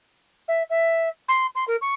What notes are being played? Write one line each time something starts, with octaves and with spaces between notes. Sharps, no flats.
E5
E5
C6
C6
A#4
C#6